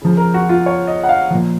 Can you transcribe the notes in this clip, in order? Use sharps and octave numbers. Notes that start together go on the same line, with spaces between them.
C#3 F3
A#4
F#4
F4
C#5
D#5
F#5
F5
A#2 F3